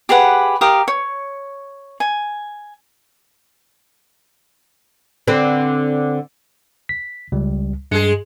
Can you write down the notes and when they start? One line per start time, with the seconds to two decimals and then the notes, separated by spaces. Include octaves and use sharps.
0.09 G4 G#4 B4 F#5
0.61 G4 A#4 F5 D#6
0.88 C#5
2.00 G#5
5.28 D3 C4 B4
6.89 B6
7.32 C#2 G3
7.91 G2 G#3 G#4 C#7